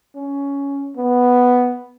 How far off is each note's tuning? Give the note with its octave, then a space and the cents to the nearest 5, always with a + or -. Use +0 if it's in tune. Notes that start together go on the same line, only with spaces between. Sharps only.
C#4 +10
B3 +0